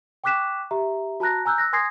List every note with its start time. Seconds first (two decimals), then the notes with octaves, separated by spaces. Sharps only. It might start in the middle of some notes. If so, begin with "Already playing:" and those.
0.24 G5 C#6 D6 F#6 B6 E7
0.71 G4 E5 A#5
1.20 F#4 A5 A#5 F#6 A#6
1.45 G#5 A#5 E6 F#6 G6
1.58 E6 F#6 A#6
1.73 G#5 C6 D#6 G#6 A#6 C7